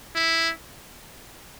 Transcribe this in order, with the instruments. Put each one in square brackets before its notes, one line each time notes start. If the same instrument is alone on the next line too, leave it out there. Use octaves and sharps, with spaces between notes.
[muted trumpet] E4